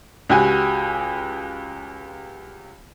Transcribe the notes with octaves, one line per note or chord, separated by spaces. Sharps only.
C#2 F#4 G4 G#5